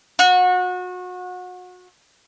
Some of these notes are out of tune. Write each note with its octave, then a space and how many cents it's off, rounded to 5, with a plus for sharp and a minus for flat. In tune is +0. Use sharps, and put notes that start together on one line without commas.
F#4 -30